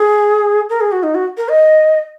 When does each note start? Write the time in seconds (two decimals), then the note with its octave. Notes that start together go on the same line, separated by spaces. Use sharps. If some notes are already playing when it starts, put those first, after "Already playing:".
Already playing: G#4
0.70 A#4
0.81 G#4
0.92 F#4
1.03 D#4
1.15 F#4
1.37 A#4
1.49 D#5